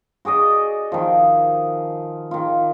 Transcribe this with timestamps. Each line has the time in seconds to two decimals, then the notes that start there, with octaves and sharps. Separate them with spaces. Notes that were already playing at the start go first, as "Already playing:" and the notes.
0.25 F#4 G#4 D5 D#5
0.92 D#3 F3
2.31 D#3 F4